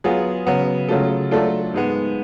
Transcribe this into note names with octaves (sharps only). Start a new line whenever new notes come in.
F#3 B3 F4 G#4
C#3 F#3 B3
C#3 F#3 A3 F4 A4
F#3 A3 D4 F4 A4
G#2 G#3 B3